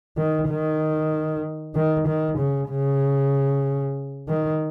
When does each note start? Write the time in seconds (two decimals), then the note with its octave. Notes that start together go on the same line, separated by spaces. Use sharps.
0.17 D#3
0.49 D#3
1.75 D#3
2.07 D#3
2.38 C#3
2.70 C#3
4.28 D#3